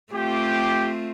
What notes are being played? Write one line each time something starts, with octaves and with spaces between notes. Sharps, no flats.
A3 C4 F4 G4